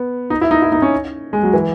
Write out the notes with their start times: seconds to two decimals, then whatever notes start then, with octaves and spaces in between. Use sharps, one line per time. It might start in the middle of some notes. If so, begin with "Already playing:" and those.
Already playing: B3
0.30 D#4
0.41 E4
0.51 D#4
0.62 E4
0.72 D#4
0.82 C#4
1.33 G#3
1.43 F#3
1.53 E3